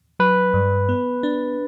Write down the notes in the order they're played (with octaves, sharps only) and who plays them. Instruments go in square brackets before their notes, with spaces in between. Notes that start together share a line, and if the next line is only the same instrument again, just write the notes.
[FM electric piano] F#3 [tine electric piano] B4
[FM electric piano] G2
B3
D4